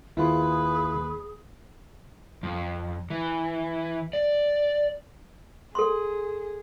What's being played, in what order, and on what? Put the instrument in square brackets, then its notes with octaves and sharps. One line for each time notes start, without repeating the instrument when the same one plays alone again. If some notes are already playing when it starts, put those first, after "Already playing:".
[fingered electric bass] D#2 D#3 [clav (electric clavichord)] E4 F4 [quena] G#4 [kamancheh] B4
[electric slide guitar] F2
E3
D5
[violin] G#4 [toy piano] A4 C6